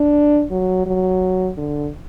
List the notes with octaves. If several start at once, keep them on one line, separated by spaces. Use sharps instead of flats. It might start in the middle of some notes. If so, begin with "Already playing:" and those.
Already playing: D4
F#3
F#3
D3